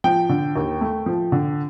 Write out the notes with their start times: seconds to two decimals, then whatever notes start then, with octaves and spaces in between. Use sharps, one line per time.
0.04 F3 G5
0.29 D3
0.56 D#2
0.81 A3
1.06 F3
1.32 D3